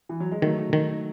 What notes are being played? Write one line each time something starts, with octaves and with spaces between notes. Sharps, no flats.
E3
F#3
G#3
D#3 F#3 A3
D#3